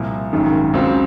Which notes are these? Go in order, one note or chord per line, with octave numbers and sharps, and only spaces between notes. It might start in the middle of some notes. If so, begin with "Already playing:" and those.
Already playing: C2 A#2 F3
G#1 F#2 D#3 G#3
C#2 C#3 F#3 C4